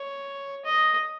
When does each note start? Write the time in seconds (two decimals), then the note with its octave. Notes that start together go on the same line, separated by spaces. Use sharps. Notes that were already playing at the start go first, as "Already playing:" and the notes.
Already playing: C#5
0.65 D#5